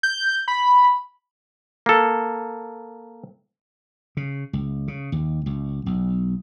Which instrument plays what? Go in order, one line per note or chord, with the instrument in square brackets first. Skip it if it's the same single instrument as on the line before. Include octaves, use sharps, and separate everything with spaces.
[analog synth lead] G6
B5
[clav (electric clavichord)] A#3 A4
[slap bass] C#3
C#2
C#3
D#2
C#2
B1